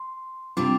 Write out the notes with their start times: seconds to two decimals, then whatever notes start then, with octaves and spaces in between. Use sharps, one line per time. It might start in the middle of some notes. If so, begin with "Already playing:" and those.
Already playing: C6
0.57 C3 G3 D4 F4 D6